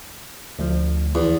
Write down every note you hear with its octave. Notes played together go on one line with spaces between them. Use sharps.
D2 F3
E2